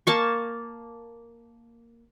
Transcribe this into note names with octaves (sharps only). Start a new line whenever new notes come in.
A#3 A5 C#6